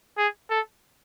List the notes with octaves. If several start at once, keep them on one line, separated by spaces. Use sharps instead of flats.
G#4
A4